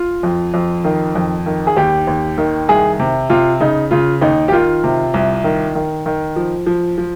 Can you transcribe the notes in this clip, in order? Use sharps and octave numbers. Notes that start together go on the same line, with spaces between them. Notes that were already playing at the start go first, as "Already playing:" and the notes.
Already playing: F4
F2
F2
D#3
F2
D#3
G#4
D#2 G4
D#2
D#3
C2 G#4
C3
C3 F4
C#3 D#4
C#3 F4
D#2 D#4
G4
D#3 F4
C3
C2
D#3
D#3
D#3
F3
F3
F3